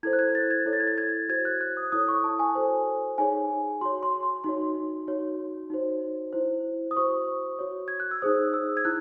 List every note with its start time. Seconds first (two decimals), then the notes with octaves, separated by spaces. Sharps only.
0.03 E4 A4 C5 G#6
0.13 F#6
0.19 G#6
0.35 A6
0.51 G#6
0.66 E4 A4 C#5
0.73 A6
0.80 G#6
0.87 A6
0.98 G#6
1.29 F#4 C5 G#6
1.45 F#6
1.61 F#6
1.77 D#6
1.92 E4 A4 C#5 D#6
2.08 C#6
2.24 A5
2.39 G#5
2.55 F#4 A4 C5
3.18 D#4 G#4 C#5 G#5
3.81 F#4 C#5 C6
4.03 C6
4.23 C6
4.44 D#4 F#4 C#5 C6
5.07 D#4 F#4 C#5
5.70 D#4 F#4 C5
6.33 E4 C5
6.91 D#6
6.96 F#4 C5 C#6
7.59 F#4 C#5
7.88 G#6
8.00 F#6
8.11 E6
8.22 D#4 G#4 C5 D#6
8.53 E6
8.77 G#6
8.85 E4 F#6